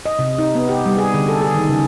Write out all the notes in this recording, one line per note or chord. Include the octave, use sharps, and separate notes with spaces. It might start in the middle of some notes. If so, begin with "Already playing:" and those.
D#5
C3
D#4
B3
G4
G3
G#4
D3
A4
G#4
D#3
C#3